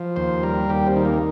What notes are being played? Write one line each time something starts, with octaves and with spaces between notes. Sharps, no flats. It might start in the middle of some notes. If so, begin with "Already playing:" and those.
Already playing: F3
D#2 C5
G3 A#4
D#2 G4
C4
D#3
A#3